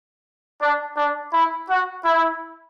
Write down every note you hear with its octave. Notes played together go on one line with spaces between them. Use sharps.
D4
D4
E4
F#4
E4